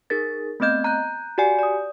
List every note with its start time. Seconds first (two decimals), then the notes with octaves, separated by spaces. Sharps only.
0.10 D#4 G#4 A#4 A6
0.60 A3 B3 C4 D#5 G6
0.84 A#5 F#6 G6
1.38 F#4 G4 D5 F#5 G#5
1.59 D5 D#6